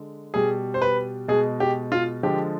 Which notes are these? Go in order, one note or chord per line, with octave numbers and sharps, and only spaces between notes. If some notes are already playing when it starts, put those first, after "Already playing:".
Already playing: D3 G#3
B2 G3 G#4
C5
B4
B2 G#3 G#4
G4
F4
D3 F3 G#3 G4